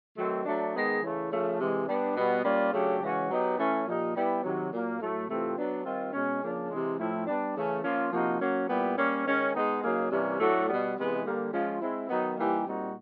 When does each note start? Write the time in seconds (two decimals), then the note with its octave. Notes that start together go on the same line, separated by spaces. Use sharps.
0.17 D#3 F#3 A3 C4
0.45 F#3 A3 D4
0.74 D#3 G#3 B3 D#4 G#4
1.02 C#3 E3 A3
1.31 C#3 F3 A3
1.59 C3 E3 G#3
1.87 G3 B3 D4
2.16 B2 G3 B3
2.44 G3 A#3 C#4 F4
2.72 C#3 F#3 A3 D4 G4
3.01 C#3 E3 G#3 C#4 F#4
3.30 F#3 B3 D#4 G4
3.58 E3 A3 C#4
3.86 A#2 F3 A#3 D#4 G4
4.15 G3 B3 E4 G4
4.43 C3 D#3 F#3
4.71 A#2 F#3 A#3
4.99 A2 F#3 A3
5.28 C3 E3 A3 C4 F4
5.56 F#3 B3 D4
5.84 D#3 G3 C4 F4
6.13 B2 G#3 C#4
6.42 C#3 F3 A#3 D4
6.70 C3 E3 G#3
6.98 A2 F3 A3 C4 E4
7.27 G3 B3 D4
7.55 C#3 E3 A3 C#4
7.83 F3 A#3 C#4 F4
8.12 C3 F3 A#3 D#4 F#4
8.40 F#3 A#3 C#4 F#4
8.69 A#2 G3 B3 E4 G4
8.97 G3 A#3 C#4
9.25 D#3 G#3 C#4
9.53 G#3 B3 D#4
9.82 C#3 F#3 A#3 D#4 G#4
10.10 C3 E3 G3 A#3 C#4
10.39 A2 F#3 A3 D4 F#4
10.67 B2 G3 B3
10.96 C3 E3 G#3 B3
11.24 D3 G3 A#3
11.52 F3 G#3 C#4 F4
11.81 G#3 C4 E4
12.09 D#3 F#3 B3 D#4
12.37 E3 G3 A#3 D#4 G4
12.66 A#2 G3 C4 D#4 F#4